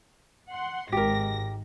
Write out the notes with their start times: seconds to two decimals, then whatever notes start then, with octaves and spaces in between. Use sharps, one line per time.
0.50 F#5 C6
0.92 G#1 G#2 G4 A#4 A#6